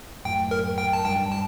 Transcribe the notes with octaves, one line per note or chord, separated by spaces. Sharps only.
F#2 A2 G5
A#4
G5
A5
G2 G5
A5